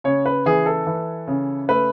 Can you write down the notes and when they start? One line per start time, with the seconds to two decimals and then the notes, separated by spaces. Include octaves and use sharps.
0.04 C#3 C#5
0.26 B4
0.46 E3 G#4
0.66 A4
0.87 E3
1.27 C#3
1.69 A3 B4